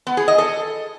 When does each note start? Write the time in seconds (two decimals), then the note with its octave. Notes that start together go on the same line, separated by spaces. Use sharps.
0.07 B3
0.17 G#4
0.28 D#5
0.38 A4